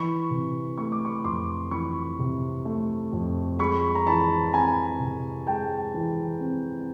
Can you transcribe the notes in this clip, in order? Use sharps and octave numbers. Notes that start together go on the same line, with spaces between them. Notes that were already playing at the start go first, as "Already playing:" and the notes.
Already playing: E3 B5 C#6
C3
A3 C#6
D6
B5 C#6
F2 C6 D6
E3 B5 C#6
C3
A3
F2
G#3 B5 C#6
A#5
E3 A5 B5
B5
C4 G#5 A#5
C3
G#3 G5 A5
E3
C4